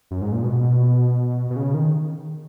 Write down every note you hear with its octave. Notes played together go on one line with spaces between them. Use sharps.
F#2
G#2
A#2
B2
B2
C#3
D#3